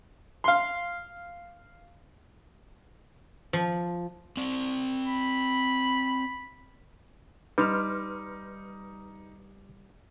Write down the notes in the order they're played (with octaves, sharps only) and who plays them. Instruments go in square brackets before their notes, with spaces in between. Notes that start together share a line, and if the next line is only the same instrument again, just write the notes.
[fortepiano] F5 C6
[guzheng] F3
[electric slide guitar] C4 D5
[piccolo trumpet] B5
[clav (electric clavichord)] G3 [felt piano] D#4 [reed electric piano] B4 C6 F6